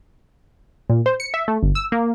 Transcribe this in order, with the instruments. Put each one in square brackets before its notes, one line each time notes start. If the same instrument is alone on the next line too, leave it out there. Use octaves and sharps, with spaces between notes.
[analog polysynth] A#2
C5
C#7
E5
A3
G1
E6
A#3